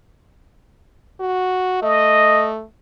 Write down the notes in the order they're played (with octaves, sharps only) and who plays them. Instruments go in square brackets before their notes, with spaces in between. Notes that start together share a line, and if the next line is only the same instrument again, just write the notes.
[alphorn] F#4
[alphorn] A3 [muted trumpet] D#5